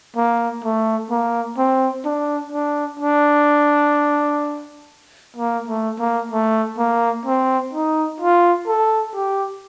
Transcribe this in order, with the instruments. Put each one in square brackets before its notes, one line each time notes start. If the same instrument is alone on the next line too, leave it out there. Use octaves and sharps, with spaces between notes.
[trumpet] A#3
A3
A#3
C4
D4
D4
D4
A#3
A3
A#3
A3
A#3
C4
D#4
F4
A4
G4